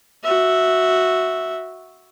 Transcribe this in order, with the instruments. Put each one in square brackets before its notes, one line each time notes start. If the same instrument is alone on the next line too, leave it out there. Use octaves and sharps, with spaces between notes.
[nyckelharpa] F#4 E5